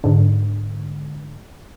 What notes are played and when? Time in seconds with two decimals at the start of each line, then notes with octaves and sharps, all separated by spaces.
0.04 G#2 D3